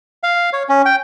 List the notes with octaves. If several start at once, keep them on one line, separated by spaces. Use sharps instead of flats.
F5
C#5
C#4
G5